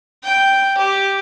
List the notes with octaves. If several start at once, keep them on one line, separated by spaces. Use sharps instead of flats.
G5
G4